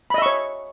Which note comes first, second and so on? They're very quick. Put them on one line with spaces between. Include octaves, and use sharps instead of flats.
B5 D#5 E5 C#6 C#5